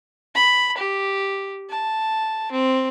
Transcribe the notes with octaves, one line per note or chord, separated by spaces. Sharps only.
B5
G4
A5
C4